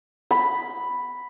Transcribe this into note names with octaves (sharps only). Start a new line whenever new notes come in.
B5